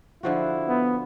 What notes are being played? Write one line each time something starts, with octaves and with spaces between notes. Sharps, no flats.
D3 F3 E4 F#4
B3